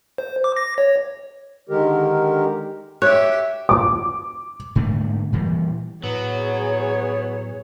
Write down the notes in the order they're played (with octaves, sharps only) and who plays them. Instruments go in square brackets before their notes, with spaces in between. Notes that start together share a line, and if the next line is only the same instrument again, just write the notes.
[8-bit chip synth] C5
D6
A#6
C#5
[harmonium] D3 D#3 G#3 G4 A#4
[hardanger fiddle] G4 E5 [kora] C#5 [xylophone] F#6
[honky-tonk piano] D6
[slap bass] G#2 D3 A3 A#3
A#2 E3 G3
[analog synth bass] A2 [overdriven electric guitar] F#3 [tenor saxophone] B3 [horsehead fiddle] G#4 C#5